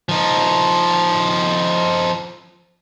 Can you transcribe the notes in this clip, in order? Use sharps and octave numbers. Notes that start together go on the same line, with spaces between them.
F3 D#4